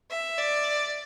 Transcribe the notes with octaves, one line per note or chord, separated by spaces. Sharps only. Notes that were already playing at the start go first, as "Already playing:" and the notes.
E5
D5